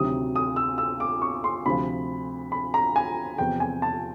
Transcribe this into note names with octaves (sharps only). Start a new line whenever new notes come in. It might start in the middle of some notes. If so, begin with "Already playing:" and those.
Already playing: D2 C3 D#3 F#3 D#6
D#6
E6
E6
D6
C#6
C6
D2 C3 F3 B5
B5
A#5
G#5
E2 C3 F3 G5
G#5
A5